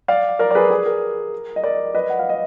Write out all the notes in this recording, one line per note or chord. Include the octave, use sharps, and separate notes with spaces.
D5 F5
A#4 D5
D5
G#4 B4
G#4
A#4
D#5
A#4 D5
B4 D#5
F#5
F5
D#5